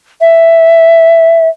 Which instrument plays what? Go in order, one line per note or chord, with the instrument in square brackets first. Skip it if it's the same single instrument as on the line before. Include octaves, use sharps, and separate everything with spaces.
[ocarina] E5